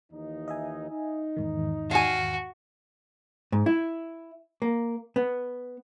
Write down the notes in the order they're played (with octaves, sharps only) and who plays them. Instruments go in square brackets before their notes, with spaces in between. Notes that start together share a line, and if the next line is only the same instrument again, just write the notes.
[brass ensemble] D#2 E3 D#4
[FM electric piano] D#5 E5 G#5
[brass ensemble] D#4
[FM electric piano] E2 G#2 D#3
[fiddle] F#4 [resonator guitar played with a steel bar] F5 G#5
[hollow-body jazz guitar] G#2
E4
A#3
B3